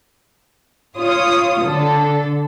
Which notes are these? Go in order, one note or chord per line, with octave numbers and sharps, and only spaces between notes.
F4 C#5 D#6
D3 A4